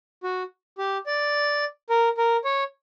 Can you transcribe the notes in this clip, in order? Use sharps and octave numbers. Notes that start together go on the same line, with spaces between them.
F#4
G4
D5
A#4
A#4
C#5